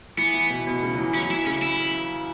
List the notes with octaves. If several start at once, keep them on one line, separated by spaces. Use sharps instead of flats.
E3 B3
E3
B2
B2
C#3
F#3
E3
F#3 C#4
E3 E4
C#3 C#4
E4